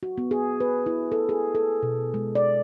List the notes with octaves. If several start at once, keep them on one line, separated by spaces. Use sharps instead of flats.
F#4
B3
G#4
B4
E4
A4
G#4
A4
B2
G#3
D5